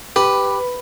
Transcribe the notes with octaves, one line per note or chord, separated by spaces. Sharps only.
G4 B4